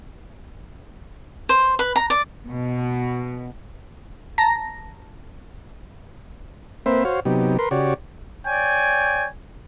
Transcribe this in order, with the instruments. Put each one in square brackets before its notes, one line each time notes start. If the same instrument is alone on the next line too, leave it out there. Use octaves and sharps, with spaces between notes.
[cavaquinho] C5
B4
A#5
D5
[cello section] B2
[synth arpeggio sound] A5 A#5 A#6
[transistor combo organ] A#3 C4 B4 C5 E5
F#4 C5 C#5 F5
C3 F#3 B3 D#4 G4
A#4 B4 C6
C#3 F#4 G4 C#5 D5
[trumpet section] C#5 D5 G5 G#5